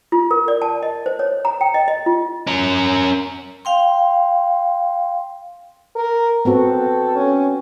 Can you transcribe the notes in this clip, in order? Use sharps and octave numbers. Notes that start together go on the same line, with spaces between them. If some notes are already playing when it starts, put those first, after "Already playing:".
F4
A#4
D5
A5
D#5
C5
C#5
A#5
G5
D#5
D#5
F4
C#4 A#4
F5 G5 C6
A#4
B3 C4 F#4 A4
C#4